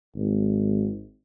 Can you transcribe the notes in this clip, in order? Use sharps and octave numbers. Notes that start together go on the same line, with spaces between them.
G#1